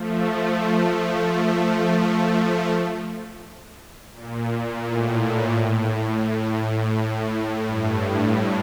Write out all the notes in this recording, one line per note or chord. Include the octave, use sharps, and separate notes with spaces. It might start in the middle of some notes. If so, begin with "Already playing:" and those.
Already playing: F3 A3
F3 A3
A#2
A#2
A2
A2
A2
G2
G2